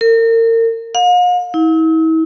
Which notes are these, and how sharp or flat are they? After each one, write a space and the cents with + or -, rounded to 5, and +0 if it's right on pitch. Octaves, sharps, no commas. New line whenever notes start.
A#4 -35
F5 +45
E4 -45